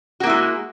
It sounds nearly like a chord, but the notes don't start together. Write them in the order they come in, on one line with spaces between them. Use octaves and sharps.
F#4 A#3 E4 G#3